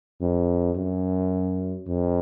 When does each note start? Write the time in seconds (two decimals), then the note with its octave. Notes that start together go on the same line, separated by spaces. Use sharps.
0.21 F2
0.77 F#2
1.88 F2